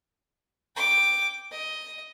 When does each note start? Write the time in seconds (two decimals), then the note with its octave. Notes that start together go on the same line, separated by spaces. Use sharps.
0.76 G5 D6
1.51 D#5